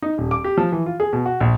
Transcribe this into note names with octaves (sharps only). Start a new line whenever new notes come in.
D#4
D#1
D6
G4
F3
E3
F4
G#4
B2
F#4
A#1